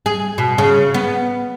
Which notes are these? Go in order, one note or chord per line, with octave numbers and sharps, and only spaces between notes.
G#4
B2
C#3
B3